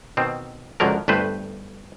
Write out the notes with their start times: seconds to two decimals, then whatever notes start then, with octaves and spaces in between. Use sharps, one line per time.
0.17 B2 D#3 C4
0.80 C#2 F#2 D3 F3 F#3 A#4
1.08 G1 G2 A3 B4 C5